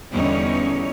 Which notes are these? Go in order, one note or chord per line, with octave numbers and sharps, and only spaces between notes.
E2 D3 G3 C#4 D#4 C#5